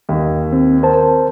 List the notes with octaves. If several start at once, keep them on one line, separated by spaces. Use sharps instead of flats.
D#2
C4
A#4 C5 A5